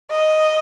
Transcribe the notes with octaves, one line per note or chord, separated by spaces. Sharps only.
D#5